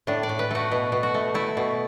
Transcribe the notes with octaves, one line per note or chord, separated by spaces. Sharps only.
A2 D4
D5
A2
B4
A3 F#4
B2
B2
F#4
A3
A3 E4
B2